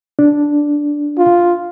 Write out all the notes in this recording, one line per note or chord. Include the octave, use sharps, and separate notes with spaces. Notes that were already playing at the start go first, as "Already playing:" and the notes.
D4
F4